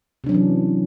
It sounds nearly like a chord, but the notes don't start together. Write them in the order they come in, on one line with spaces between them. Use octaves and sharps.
C3 D4 F#3 C#4 E3